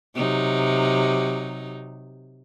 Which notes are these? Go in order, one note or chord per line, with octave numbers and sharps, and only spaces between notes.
C3 F#3 D#4